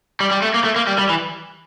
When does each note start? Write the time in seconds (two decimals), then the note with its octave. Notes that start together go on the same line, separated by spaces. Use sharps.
0.20 G3
0.31 G3
0.42 A3
0.54 A#3
0.64 A3
0.76 A#3
0.87 G3
0.98 G3
1.09 E3